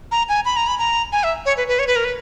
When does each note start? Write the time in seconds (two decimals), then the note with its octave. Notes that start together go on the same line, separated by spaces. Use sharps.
0.11 A#5
0.29 G#5
0.45 B5
0.56 A#5
0.67 B5
0.79 A#5
1.12 G#5
1.24 E5
1.46 C#5
1.57 B4
1.68 B4
1.79 C#5
1.87 B4
1.96 A#4
2.04 B4